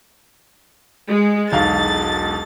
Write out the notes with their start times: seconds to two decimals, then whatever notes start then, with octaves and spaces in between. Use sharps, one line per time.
1.08 G#3
1.52 E1 B1 F5 A6